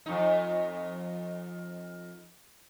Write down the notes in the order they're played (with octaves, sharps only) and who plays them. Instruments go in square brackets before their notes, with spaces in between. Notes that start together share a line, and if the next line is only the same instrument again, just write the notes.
[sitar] F2 D#4